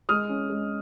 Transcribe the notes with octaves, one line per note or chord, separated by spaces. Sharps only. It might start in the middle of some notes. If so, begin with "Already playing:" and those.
G#3 D#6 F6
C#4
G#3